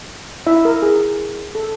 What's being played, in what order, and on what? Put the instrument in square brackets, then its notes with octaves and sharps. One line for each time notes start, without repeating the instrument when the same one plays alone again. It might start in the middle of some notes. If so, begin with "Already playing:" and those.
[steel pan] E4 E5
A#4
G#4
A4